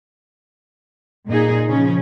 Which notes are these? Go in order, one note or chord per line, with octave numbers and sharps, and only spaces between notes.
A#2 D#4 G#4
C#3 F3 C#4